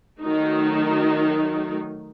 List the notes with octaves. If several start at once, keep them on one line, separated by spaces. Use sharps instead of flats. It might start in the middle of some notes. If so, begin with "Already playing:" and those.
D#3 F#3 A3 D#4